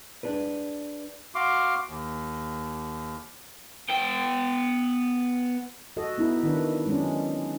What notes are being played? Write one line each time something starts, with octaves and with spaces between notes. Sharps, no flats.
D4 G#4 B4
F#4 F5 C6 D6
D#2
B3 G5
F#4 A4 D#5
B3 D#4 E4
D#3 D4 B4
F#3 G#3 C#4 D4 G#4